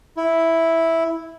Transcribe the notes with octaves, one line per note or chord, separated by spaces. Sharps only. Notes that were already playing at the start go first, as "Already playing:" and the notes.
E4